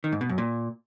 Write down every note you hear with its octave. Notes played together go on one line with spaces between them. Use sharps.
D#3
G#2
B2
F#2
A#2